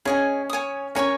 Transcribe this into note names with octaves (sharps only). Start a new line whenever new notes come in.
C#4 G#4 D#5 G#5
C#5 G#5 D#6
C#4 A#4 C#5 G#5 C#6